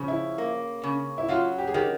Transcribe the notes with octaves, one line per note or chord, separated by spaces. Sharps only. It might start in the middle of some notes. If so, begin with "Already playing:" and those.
Already playing: C#3 F3
E4
A#3
C#3
E4
F#3 F4
G4
G#4
D#3 G4